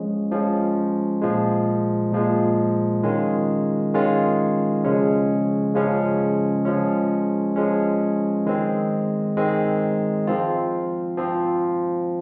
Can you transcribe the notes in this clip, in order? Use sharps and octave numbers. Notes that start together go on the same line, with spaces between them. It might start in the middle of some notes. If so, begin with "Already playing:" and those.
Already playing: F3 G#3 C#4
F3 G#3 C#4
A#2 F3 G#3
A#2 F3 G#3
D#3 G#3 C#4 F4
D#3 G#3 C#4 F4
C#3 F3 G#3 C#4
C#3 F3 G#3 C#4
F3 G#3 C#4
F3 G#3 C#4
D#3 G#3 C4
D#3 G#3 C4
F3 C4 F4
F3 C4 F4